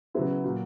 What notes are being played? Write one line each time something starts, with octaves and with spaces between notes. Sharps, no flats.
C#3 F#3 B3 E4
A#2 F#3 A#3